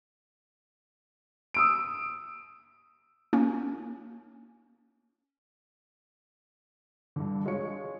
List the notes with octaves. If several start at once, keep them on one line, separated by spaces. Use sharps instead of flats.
D#6 E6 D7
A#3 C#4
G2 D3
G#3 F4 C#5 C#7